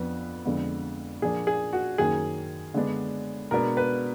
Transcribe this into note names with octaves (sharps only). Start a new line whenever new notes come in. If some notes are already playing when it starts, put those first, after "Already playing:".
Already playing: F2 F3 B3 D4 B4
F2 D3 G#3 B3
A#2 F3 A#3 D4 G#4
G#4
F#4
F#2 D#3 A#3 G#4
D3 G#3 B3 D4
B2 G#3 B3 D4 A#4
B4